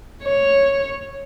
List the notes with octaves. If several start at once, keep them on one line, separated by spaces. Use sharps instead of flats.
C#5